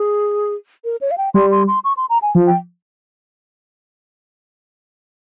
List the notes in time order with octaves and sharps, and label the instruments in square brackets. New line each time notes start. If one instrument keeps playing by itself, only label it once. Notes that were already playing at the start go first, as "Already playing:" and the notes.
Already playing: [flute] G#4
A#4
C#5
F5
G5
[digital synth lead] G3 [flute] C6
[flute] C6
C6
C#6
C6
A#5
G#5
[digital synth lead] F3
[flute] G5